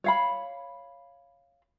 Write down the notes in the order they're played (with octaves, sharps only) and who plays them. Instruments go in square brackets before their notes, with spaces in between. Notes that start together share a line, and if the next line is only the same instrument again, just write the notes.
[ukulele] C#5 F5 B5